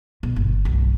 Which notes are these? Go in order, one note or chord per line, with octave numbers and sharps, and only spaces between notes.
B2
G1
B1